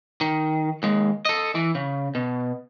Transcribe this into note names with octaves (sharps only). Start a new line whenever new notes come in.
D#3
D#2 G#3
A4 D#5
E3
C#3
B2